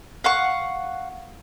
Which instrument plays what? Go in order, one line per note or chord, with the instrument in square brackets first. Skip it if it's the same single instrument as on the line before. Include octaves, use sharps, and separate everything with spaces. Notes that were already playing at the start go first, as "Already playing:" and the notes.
[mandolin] F5 F#5 C#6